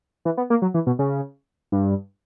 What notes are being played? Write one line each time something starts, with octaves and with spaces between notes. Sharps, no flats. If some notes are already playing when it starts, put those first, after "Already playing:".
E3
B3
A#3
F#3
E3
B2
C#3
G2